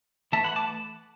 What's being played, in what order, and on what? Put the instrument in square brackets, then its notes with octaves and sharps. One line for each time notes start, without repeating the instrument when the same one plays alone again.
[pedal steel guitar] E3 A3 E5 A5
F#5 B5
A5 D6